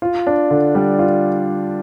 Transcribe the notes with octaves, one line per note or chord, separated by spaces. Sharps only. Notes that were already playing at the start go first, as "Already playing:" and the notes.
F4
D4
D3
G3
F4